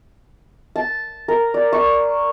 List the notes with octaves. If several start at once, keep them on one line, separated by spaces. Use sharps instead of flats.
A5
A#4
D5
C#6